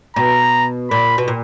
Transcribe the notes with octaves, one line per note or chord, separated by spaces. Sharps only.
B2 A#5
A#2 B5
B2
A#2